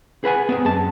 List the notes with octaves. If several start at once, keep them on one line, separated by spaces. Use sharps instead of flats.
G#4 B4 F#5 G#5
B3 C4 G#4
F#2 A5